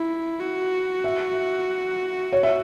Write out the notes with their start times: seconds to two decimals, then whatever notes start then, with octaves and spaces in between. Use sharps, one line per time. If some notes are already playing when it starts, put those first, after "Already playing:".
Already playing: E4
0.39 F#4
1.04 E5
2.33 C#5
2.43 E5